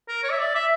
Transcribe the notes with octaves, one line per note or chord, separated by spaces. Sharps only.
A#4
C#5
E5
D5
E5